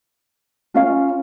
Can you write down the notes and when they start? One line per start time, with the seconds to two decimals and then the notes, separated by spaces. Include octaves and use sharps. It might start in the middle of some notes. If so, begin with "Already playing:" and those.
0.74 C#4 F4 A#4 F5